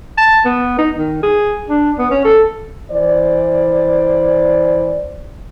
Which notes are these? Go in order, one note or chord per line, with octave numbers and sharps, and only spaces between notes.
A5
B3
D#4
D#3
G#4
D4
B3
C#4
A4
E3 C5 D5